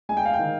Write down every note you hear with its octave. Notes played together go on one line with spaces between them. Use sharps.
G#3 G#5
G5
F5
G5
D#3